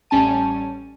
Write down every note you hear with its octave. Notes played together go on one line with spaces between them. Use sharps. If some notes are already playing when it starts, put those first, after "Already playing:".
A1 G3 C#4 G#5 A5 D#7